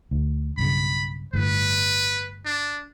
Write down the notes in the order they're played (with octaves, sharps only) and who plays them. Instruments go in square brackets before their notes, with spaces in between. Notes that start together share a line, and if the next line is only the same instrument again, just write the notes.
[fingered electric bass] D2
[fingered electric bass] B1 G2 C#3 [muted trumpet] B5
[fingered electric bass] G1 A2 [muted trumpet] B4
[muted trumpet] D4